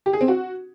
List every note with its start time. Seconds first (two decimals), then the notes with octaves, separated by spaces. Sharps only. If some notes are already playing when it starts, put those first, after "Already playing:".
0.06 G4
0.13 G#4
0.21 C4
0.28 F#4